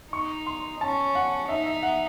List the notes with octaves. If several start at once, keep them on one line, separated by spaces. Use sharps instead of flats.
D#4 C#6
C6
C#4 A5
F#5
D#4 E5
E5
F#5